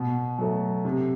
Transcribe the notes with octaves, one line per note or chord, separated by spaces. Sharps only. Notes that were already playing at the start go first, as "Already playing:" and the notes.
Already playing: B2
F#3 A3
C3